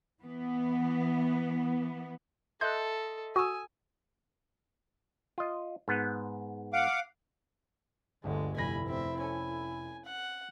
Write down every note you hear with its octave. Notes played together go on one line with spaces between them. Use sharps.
E3 B3
A4 D#5 E5 C6 F#6 G6
F#4 G#5 D#6 E6
F4 D#5
G#2 B3
F5 F#5 D6
G1 D2 G2 D3 G#3
F1 E4 G#5 B5 A#6
C4 E5
C#4 A4 G#5
F#5